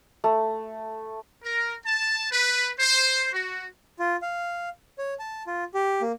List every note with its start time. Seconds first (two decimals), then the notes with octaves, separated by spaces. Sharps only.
0.24 A3
1.43 A#4
1.85 A5
2.31 B4
2.78 C5
3.33 F#4
3.99 F4
4.22 F5
4.98 C#5
5.19 A5
5.47 F4
5.74 G4
6.02 A#3